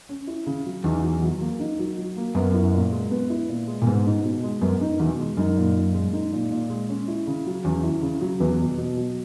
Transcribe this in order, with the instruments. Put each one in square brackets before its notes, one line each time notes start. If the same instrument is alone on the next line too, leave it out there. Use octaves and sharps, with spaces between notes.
[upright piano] C#4
E4
C#3
F#3
[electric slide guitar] E2 [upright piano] D#4
[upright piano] F#3
F#3
A#3
D#4
F#3
F#3
A#3
[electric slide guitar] F#2 [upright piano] B3
[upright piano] E4
A#2
G#3
B3
E4
A#2
G#3
[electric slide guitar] A#2
[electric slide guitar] G#2 [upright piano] B3
[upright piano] D#4
B2
G#3
[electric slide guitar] F#2 [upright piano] B3
[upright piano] D#4
[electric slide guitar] E2 [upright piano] B2
[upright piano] G#3
[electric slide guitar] F#2 [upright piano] D#4
[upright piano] A#2
A#2
G#3
D#4
A#2
A#2
G#3
C#4
E4
C#3
F#3
[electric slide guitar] E2 [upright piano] C#4
[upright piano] E4
C#3
F#3
[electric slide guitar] E2 [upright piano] B3
[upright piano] B2
B2
F#3